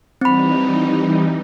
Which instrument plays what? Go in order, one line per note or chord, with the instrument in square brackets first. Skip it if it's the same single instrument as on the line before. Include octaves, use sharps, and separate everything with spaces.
[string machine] E3 G3 D#4 [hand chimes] C4 B5